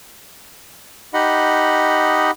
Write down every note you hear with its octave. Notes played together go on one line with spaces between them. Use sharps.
D#4 G4 D#5 F#5 B5